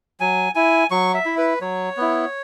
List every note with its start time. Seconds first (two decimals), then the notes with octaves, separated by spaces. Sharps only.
0.20 F#3 G#5
0.55 E4 G#5
0.91 F#3 C#6
1.14 E5
1.26 E4
1.38 B4
1.61 F#3 C#5
1.97 B3 E4